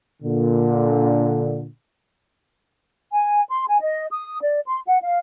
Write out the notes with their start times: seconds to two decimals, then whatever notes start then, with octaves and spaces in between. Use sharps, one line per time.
0.23 A#2 D3
3.13 G#5
3.50 C6
3.68 G#5
3.81 D#5
4.11 D#6
4.42 D5
4.67 C6
4.87 F#5
5.02 F5